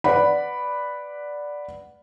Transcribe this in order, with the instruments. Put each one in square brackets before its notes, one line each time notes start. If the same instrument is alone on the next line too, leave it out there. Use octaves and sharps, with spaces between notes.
[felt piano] B4 D5 F#5 B5